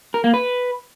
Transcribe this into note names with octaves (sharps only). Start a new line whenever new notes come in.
A#4
A#3
B4